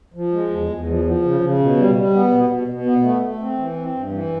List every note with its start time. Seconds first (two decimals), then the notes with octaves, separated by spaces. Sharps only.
0.14 F3
0.32 G#3
0.50 E2
0.69 E2
0.87 F3
1.05 F3
1.23 C#3
1.41 C#3
1.59 B2
1.77 G3
1.95 G3
2.14 B3
2.31 B2
2.49 B2
2.67 B2
2.86 B3
3.03 A3
3.22 A3
3.40 C4
3.58 E3
3.76 C4
3.94 G2
4.12 E3